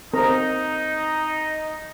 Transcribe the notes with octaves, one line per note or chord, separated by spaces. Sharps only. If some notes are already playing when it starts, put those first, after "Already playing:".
C4 D#4 A#4 A#5